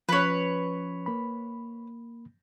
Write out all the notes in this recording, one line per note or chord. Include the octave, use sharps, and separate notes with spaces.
F3 C#4 B4 C#5
A#3 B5